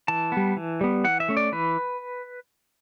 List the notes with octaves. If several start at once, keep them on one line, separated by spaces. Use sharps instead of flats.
E3 A5
G3 B3
E3
G3 B3
E3 F#5
E5
A3 C#4
D5
E3 B4